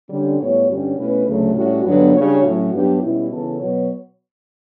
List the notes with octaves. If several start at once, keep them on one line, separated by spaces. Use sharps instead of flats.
D3 G3 C#4
A2 G3 B3 F#4 C#5
G2 D3 G3 C#4 F#4
B2 A3 C#4 E4 B4
D2 C#3 F#3 A3
A2 G3 C#4 F#4
G2 D3 F#3 B3
C#3 G3 D4 F#4 C#5
A2 F#3 C#4 F#4
G2 F#3 B3 D4 G4
B2 G3 C#4 E4
C#3 E3 B3 F#4 A4
B2 F#3 B3 F#4 C#5